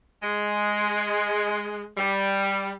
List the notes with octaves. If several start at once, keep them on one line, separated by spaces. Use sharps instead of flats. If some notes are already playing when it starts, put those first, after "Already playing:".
G#3
G3